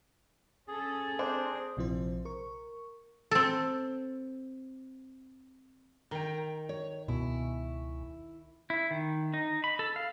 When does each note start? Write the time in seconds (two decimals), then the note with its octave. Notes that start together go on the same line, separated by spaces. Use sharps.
0.68 C#4 G#4 A4
1.19 C4 D4 C5
1.77 A#1 C3 F3 E4 C5
2.25 A#4 C#6
3.31 C4 A4
6.11 D#3 G5 A#5
6.69 C#5
7.08 C#2 B2 E4
8.70 E4
8.91 D#3
9.34 D#4
9.64 B5
9.79 A4
9.96 F5